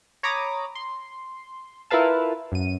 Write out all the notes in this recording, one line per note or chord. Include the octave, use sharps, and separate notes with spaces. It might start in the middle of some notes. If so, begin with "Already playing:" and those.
C#5 A#5 B5 D6 D#6
C6
E4 F4 A#4 B4 F5 A5
F#2 D#7